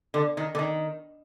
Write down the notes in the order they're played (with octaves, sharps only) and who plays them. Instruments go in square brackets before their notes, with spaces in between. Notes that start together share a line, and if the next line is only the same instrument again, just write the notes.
[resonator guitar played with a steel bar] D3
D#3
D3
D#3